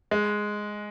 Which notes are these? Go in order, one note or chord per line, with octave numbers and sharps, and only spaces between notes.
G#3